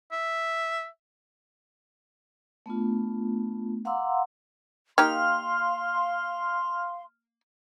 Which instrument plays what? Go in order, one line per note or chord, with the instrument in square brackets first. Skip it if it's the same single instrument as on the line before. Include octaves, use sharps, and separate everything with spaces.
[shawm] E5
[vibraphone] A3 B3 D4 F4
F5 F#5 A#5 C6 D6 E6
[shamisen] A#3 D#4 G4 [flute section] F5 C6 [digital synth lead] F6